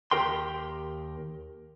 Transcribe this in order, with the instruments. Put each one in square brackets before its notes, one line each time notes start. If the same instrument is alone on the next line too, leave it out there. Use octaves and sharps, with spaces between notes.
[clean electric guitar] D#2 G4 A#4 G5 C6